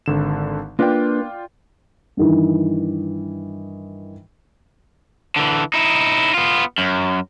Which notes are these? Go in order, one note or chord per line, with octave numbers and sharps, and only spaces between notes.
G#1 D3 E7
A#3 D4 F4 B4 D5 G5
G2 D#3 E3
D3 E3
D#4 E4
B3 F4
F#2